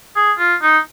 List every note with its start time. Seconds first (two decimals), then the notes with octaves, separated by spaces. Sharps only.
0.16 G#4
0.39 F4
0.62 D#4